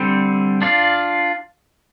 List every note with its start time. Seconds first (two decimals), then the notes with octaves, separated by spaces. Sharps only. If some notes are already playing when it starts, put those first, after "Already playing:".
Already playing: D3 G3 C4
0.62 D4 F4 D5 F5